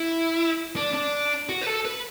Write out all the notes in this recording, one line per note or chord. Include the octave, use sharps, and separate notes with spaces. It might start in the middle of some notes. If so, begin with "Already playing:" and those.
Already playing: E4
D4
D4
F#4
B4
A4
B4